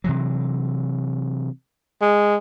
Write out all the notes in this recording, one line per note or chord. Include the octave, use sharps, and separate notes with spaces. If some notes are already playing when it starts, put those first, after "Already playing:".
C3 E3 F#3
G#3